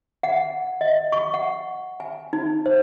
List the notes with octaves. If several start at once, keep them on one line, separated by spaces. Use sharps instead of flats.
F#5
D#5
C#6
F#5
G#5
D#4
C5